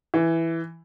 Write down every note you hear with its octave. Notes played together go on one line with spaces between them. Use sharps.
E3